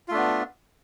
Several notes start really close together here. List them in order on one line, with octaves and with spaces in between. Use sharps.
F4 A3 D4 B3